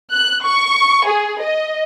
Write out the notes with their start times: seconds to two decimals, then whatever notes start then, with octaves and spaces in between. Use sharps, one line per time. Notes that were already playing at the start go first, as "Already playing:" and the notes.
0.13 F#6
0.44 C#6
1.07 G#4
1.41 D#5